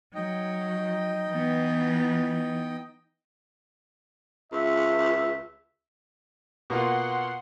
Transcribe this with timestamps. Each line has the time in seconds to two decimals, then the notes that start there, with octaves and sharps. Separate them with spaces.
0.15 F#3 D#4 D#5 G5
1.29 E3 B3
4.52 C#2 E5
6.70 B2 A#3 F4 F#5 C6